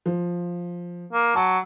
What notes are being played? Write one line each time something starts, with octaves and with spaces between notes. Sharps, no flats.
F3
A#3
F#3 A5